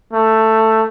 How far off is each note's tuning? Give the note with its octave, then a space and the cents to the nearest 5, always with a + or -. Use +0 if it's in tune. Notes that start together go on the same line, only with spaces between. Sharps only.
A3 +10